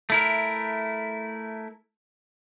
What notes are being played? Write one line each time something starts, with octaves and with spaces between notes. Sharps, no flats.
A3 E4 A#4